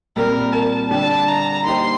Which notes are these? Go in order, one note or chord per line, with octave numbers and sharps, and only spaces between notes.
A#2 G3 C4 A#4
A5
D3 G3 D4 G4 A5
A#5
A#3 D#4 G4 C5 C6